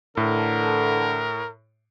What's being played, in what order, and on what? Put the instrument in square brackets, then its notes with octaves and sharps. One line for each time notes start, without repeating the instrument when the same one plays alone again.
[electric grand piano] A2 [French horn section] D3 E3 A4 [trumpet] A#4